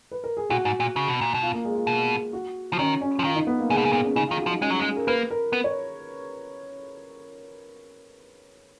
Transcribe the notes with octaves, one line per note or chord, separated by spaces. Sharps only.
B4
A#4
G#4
A#2 F#4
G#2
A#2
C#3
B2
A#2
B2
F4
A#3
G#3
F4
B2
F#4
F3
D#3 C#4
C#4
F3
D#3 F4
D#4
B3
A#3
C#3 G#3
B2
C#3
A#2 B3
C#4
C#3 D#4
F4
D#3 G#4
F#4
F3
D#4
G#3 C#4
F#3 G#4
G#3
G#4
A#4
A#3 B4
A#4
B3
C#5